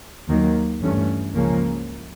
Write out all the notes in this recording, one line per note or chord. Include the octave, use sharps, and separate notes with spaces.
D#2 D#3 F#3 A#3
G2 E3 A3 C#4
C#2 C#3 F3 A#3 C#4